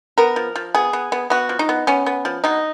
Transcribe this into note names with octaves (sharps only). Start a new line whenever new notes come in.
B3 A#4
F3
F3
B3 G#4
B3
B3
B3 F#4
F3
D#4
B3
B3 C#4
B3
F3
B2 D#4